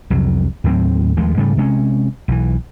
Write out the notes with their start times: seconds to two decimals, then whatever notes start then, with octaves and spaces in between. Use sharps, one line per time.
0.10 C2 F2 F#3
0.64 D#2 A2 F#3 C4
1.17 D#2 F3 G#3 A3
1.37 G#2 C#3 G3 A3
1.57 C3 G#3 C4 C#4
2.28 B1 E3